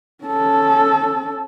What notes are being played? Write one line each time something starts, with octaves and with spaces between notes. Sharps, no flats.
C#4 A4